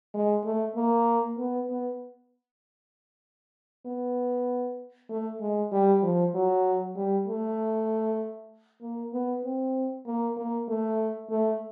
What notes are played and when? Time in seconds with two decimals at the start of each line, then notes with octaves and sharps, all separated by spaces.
0.14 G#3
0.45 A3
0.76 A#3
1.38 B3
1.69 B3
3.86 B3
5.10 A3
5.41 G#3
5.72 G3
6.03 F3
6.35 F#3
6.96 G3
7.28 A3
8.82 A#3
9.13 B3
9.44 C4
10.07 A#3
10.37 A#3
10.68 A3
11.30 A3